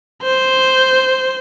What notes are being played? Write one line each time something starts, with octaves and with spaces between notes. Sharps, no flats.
C5